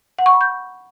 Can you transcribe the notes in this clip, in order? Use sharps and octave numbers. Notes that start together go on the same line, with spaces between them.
F#5
C#6
B5
G6